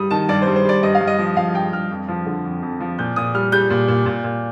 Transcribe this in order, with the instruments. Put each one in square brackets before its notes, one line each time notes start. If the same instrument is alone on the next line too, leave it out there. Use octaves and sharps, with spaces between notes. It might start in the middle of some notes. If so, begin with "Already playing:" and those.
Already playing: [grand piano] G2 G3 D#6
D#3 A5
G2 D5
G2 C5
C5
G3 D5
G2 D#5
F5
G2
D#5
F3
F3 F5
G2 G5
G2 F6
F2
F3
D3
F2
F2
F3
A#2 G6
A#2 D#6
G3 F6
G3 G6
A#2
A#2
A#2
A#2